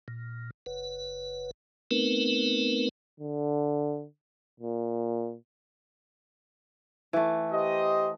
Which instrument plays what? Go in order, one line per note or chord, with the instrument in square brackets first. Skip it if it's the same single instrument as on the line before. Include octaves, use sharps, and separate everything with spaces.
[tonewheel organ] A#2
F#1 B4
A3 B3 C4 D#4 A#4 B4
[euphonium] D3
A#2
[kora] E3 A3
[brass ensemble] G4 C5 D#5